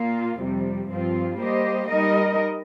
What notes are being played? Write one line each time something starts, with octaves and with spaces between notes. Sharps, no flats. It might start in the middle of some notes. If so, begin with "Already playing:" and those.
Already playing: A#2 A#3 F4
F2 C3 G3
G2 F3 C4 F4
G3 A#3 G4 C5 D#5
G3 D#4 A#4 D#5